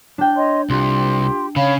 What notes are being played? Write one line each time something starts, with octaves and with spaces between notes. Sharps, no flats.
D4 G5
C#5 D#5 C6
C2 F4 G4 C6
C#3 C#5 F5 B5